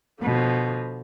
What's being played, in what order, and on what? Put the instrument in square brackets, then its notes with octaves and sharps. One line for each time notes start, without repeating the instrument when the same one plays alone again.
[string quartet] B2 D3 F3